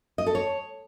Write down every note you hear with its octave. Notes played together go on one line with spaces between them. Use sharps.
D#5
A4
C#5